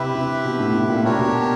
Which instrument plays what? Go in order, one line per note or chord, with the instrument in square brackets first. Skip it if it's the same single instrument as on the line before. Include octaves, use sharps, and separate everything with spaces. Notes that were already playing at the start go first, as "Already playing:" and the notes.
Already playing: [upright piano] C3 [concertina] E4 G4 B4 E5
[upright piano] C3
B2
A2
A2
A#2
[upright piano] A#2 [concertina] D4 G4 A#4 C#5
[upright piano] B2